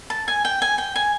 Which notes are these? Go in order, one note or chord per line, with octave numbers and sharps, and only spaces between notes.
A5
G#5
G5
G#5
G5
G#5